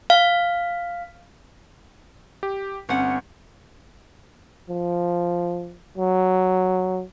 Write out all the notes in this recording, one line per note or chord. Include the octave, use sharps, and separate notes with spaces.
F5
G4
G1 C4 C#4 F#5 C#7
F3
F#3